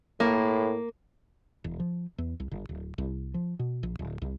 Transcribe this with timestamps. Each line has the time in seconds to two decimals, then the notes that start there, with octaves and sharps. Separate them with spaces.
0.20 A2 A#3
1.64 E1
1.80 F3
2.18 E2
2.40 C2
2.51 G1
2.69 D1
2.98 C2
3.34 F3
3.59 B2
3.83 A#1
3.99 D1
4.22 C2